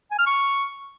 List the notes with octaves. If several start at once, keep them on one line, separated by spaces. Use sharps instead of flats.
G#5
F6
C#6